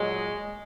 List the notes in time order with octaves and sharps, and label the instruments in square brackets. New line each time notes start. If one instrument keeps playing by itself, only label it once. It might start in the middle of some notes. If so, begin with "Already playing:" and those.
Already playing: [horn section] A#2 F#3 G#3